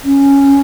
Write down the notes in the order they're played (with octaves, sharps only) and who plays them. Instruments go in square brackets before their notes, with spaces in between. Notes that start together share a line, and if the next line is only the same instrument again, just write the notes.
[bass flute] C#4